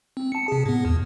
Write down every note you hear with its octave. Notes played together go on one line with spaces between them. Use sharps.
C4
A5 C#7
C3 G#4
A2 B3
E2